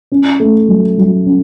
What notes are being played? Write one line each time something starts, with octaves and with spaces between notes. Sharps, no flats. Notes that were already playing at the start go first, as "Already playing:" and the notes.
C#4
A3
F#3
F#3
C#4